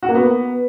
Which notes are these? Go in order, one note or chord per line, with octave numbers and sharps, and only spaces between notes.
F#4
A#3
B3